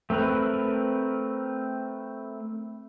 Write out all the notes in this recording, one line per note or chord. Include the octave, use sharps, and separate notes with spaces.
A3 C4 A#4 B4